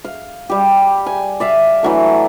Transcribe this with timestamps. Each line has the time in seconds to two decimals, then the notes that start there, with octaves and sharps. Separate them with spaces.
0.04 F5
0.50 G3 G4
1.06 G#5
1.40 D5 E5 F5
1.83 E3 F#3 A3